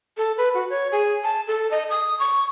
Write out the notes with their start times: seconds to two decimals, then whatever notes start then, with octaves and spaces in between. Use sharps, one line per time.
0.17 A4
0.38 B4
0.54 F#4
0.70 C#5
0.92 G#4
1.24 A5
1.47 A4
1.71 D#5
1.90 D#6
2.19 C#6